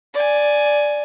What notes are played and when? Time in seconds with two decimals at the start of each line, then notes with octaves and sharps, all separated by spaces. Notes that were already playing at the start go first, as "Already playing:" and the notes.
0.14 D5 G#5